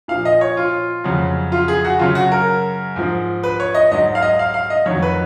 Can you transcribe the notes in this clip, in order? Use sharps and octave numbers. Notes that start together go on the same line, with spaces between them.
A#2 F3 F5
D#5
C#5
F4
F2 C#3 F#3
F4
G#4
F#4
F#2 C#3 F#3 F4
F#4
A#4
G#2 F3
B4
C#5
D#5
G#2 F#3 D#5
F5
D#5
F5
F5
D#5
F2 D#3 F#3 C#5
B4